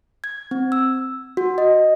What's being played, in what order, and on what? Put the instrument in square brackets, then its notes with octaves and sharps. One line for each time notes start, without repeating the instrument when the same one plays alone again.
[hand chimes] G#6
C4
E6
F#4
D#5